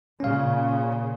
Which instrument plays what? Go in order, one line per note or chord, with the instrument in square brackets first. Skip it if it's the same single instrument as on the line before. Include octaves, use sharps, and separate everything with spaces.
[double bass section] A#2 C#3 [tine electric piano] C#4 F5